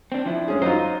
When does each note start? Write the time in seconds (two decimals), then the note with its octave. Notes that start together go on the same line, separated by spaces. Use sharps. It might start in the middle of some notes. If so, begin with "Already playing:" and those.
0.12 C4 D4
0.26 F3 D4 E4
0.48 G#3 C#4 G#4
0.62 F#3 D#4 F4 C5 D#5